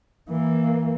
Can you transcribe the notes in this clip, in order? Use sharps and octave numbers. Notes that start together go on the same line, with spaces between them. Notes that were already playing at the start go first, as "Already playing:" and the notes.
E3 A#3